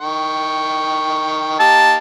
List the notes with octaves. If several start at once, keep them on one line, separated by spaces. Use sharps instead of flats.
D#3 G5 C#6
A#3 D#4 G4 A5